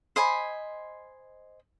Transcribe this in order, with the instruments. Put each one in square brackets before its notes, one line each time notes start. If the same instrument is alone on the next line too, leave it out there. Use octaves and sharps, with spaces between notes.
[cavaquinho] C5 D#5 G#5 B5